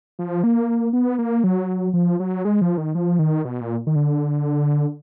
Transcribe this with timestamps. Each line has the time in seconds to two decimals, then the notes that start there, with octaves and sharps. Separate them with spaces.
0.19 F3
0.44 A#3
0.93 B3
1.19 A#3
1.44 F#3
1.94 F3
2.20 F#3
2.45 G#3
2.61 F3
2.77 D#3
2.95 F3
3.19 D#3
3.45 B2
3.61 A#2
3.87 D#3
3.96 D3